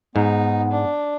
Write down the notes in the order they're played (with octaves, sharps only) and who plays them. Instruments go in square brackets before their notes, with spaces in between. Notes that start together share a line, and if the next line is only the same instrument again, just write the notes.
[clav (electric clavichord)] G#2 [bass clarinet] B3 [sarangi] D#4
[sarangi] D4